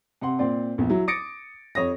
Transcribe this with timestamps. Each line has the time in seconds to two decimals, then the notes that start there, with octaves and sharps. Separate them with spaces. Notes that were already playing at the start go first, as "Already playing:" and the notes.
0.22 C3 F#5 C6
0.39 A#2 C4 D5 C6
0.78 A#1 E2
0.90 F#3 E4
1.08 D6 D#6 A6 A#6 C#7 D7
1.75 F2 C#5 D#6 A#6